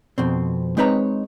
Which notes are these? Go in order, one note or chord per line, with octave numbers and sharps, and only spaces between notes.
F2 B2 C4
G#3 C4 D#4 B4 C#5 A#5